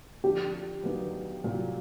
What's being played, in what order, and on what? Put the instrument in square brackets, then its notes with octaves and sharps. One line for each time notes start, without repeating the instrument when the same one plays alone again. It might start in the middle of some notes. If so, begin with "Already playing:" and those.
[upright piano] F2 D3 F3 [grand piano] G4
[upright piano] D#2 D3 F#3 B3 D#4
C2 A#2 F#3